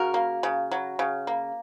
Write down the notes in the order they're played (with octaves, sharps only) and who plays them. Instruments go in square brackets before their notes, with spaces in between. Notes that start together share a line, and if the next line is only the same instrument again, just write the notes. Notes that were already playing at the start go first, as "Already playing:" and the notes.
Already playing: [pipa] C#3 F#4 A#4
A#3
C#3
F#3
C#3
A#3